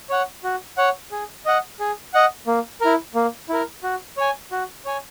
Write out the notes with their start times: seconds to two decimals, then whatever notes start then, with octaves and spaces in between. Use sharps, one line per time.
0.10 C#5 F#5
0.44 F#4
0.77 C#5 F#5
1.12 G#4
1.45 D#5 F#5
1.79 G#4
2.14 D#5 F#5
2.47 A#3
2.81 E4 A#4
3.15 A#3
3.49 E4 A#4
3.83 F#4
4.17 C#5 G#5
4.51 F#4
4.85 C#5 G#5